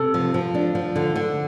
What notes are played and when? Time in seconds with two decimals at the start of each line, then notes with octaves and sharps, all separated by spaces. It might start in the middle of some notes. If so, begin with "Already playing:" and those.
Already playing: C3 A4
0.14 F3
0.34 F3
0.55 D4
0.75 F3
0.96 D3
1.16 D3